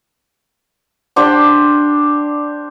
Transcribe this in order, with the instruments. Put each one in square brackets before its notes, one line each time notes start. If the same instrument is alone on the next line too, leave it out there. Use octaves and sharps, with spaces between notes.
[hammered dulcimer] D4 G4 C5